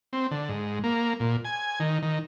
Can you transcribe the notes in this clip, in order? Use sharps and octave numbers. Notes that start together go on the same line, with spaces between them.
C4
D3
G#2
A#3
A#2
G#5
D#3
D#3